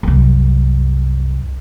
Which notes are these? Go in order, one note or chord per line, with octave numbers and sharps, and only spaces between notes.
C2 F#2